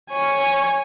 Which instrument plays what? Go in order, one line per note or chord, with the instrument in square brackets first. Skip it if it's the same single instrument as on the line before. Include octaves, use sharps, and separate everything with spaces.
[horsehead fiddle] C#5 G#5